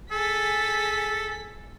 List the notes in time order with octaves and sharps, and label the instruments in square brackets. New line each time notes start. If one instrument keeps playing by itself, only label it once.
[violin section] G#4 B6 [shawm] A4